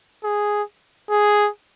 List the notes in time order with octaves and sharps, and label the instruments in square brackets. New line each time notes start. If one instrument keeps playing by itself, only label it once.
[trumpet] G#4
G#4